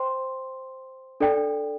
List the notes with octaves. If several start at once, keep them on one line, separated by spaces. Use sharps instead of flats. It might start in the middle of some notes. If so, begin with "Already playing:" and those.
Already playing: C5 G5 C6
D4 A4 D5 G5